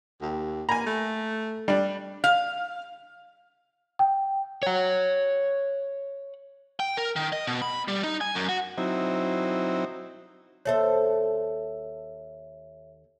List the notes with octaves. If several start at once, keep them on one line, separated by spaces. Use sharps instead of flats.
D#2
A#3 G#5 A#5
A3
G3 D4
F5
G5
C#5 F#5
G5
A#4
D#3
D#5
B2
B5
G3
D#4
G#5
F#2
F#4
F#3 C4 D#4 E4
D#2 A4 C5 C#5 E5